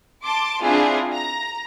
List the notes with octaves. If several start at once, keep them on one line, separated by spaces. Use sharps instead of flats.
A5 C6 D6
C4 D4 E4 F4 G#4
A#5